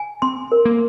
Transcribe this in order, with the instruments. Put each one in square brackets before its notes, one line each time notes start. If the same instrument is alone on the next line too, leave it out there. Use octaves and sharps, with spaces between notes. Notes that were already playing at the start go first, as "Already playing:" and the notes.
Already playing: [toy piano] G#5
[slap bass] C4 [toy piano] C6
[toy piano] A#4
[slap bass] A#3